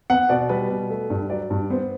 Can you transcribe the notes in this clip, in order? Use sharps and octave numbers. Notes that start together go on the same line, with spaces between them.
B3 F#5
B2 D5
G3 B4
B2
A3
G2
F#3 D5
G2
B3 C5